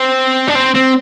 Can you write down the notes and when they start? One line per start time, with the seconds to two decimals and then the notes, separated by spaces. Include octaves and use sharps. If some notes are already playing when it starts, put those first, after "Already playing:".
Already playing: C4
0.48 D4
0.55 C4
0.74 C4